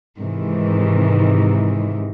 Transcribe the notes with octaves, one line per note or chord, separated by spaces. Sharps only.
G#2 C3 D#3 E3